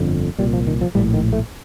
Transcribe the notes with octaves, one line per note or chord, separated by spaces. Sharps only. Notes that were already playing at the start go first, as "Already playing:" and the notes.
Already playing: G1 F2 D3
C2 A#2 G3
F3
D#3
F3
A#1 A2 G3
D#3
A3